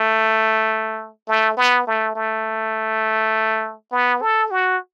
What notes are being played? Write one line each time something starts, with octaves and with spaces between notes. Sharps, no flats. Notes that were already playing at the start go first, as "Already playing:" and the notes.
Already playing: A3
A3
B3
A3
A3
B3
A4
F#4